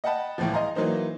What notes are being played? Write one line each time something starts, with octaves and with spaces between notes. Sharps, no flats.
D#5 F#5 G5 A5 B5
G1 C#2 A2 E3 F3
D#5 F5 G#5 A#5 C6
E3 F#3 A#3 D#4 C5